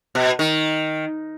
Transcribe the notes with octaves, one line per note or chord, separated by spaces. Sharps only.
B2
D#3